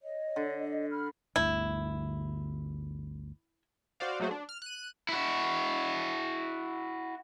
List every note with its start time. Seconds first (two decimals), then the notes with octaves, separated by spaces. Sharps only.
0.01 C#5 D#5
0.36 D3
0.90 B5 F6
1.36 G1 D2 E4
4.00 F#4 C5 D5 F5
4.20 F#3 A3 A#3 F#4 G#4 C5
4.31 D4
4.49 F6
4.62 F#6 D#7
5.09 E4 F#4